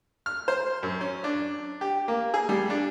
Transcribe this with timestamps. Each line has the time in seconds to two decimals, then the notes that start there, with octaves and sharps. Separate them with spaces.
0.26 F6
0.48 C5
0.83 F#2
1.01 C#4
1.24 D4
1.81 G4
2.08 A#3
2.34 G#4
2.49 G3
2.70 D4